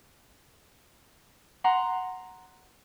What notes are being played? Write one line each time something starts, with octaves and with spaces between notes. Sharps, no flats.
F#5 A#5 C6